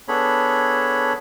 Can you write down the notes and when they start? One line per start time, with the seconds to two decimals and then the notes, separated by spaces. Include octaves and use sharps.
0.08 B3 D4 G#4 A4 C#5 B5